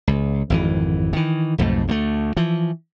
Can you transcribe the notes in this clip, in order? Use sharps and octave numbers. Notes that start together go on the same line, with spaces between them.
C#2
G#1 F2 E3
D#3 E3
B1 F2 G#2 A3
D2 F#3 A3
E3 F3